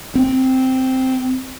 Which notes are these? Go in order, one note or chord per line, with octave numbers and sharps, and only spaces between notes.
C4